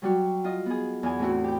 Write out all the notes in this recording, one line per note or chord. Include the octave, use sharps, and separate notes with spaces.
F#3 G3 F#4
F4 D#5
B3 G#4
E2 G#5
A2 A3 C4 E4 F#4
G4 G5